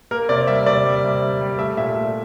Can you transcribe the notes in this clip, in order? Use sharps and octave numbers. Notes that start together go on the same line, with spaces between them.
A#3 A#4
C3 D5
G3 E5
C3 D5
G3
C3
G3
G3
A3 E5
A#2 E5
A3